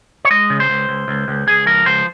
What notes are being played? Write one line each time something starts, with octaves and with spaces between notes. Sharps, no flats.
C#5
G#3 D#5
C#3
C5
C#2
C#2
C#2
C#2
C#2 G#4
F3 A#4
C#2 C5